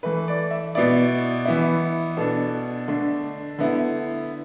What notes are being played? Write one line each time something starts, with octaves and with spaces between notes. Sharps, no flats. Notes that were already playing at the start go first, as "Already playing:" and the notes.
E3 A3 E4 B4
D5
E5
B2 B3 E4 D5
E3 B3 E4
B2 B3 D4 A4
D3 A3 D4
D3 B3 E4